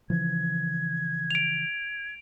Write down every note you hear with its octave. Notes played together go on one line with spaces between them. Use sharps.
C#3 E3 F3 G#6
D7 F7